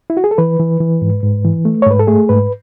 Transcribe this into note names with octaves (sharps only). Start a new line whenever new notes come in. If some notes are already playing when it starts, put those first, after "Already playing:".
E4
F#4
G#4
A4
E3 B4
E3
E3
G#2
G#2
E3
A3
C#5
G#2 B4
A4
A3 G#4
G#2 B4